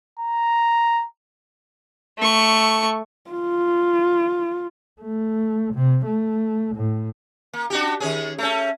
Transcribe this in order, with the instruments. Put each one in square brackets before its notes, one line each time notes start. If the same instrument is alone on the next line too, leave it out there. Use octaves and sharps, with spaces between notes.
[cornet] A#5
[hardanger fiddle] A3 C#6
[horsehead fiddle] F4
[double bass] A3
C3
A3
A2
[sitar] A#3
D4 F#4 G4
D#3 C#4 G#4
A3 C#4